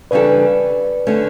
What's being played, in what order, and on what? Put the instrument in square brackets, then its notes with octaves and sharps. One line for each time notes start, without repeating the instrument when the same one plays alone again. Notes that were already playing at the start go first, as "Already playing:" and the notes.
[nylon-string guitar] C#3 E3 G3 D4 A4 [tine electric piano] B4 D5
[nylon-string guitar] D3 A3 C#4